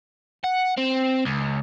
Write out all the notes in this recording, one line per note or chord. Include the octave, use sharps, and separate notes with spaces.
F#5
C4
C#2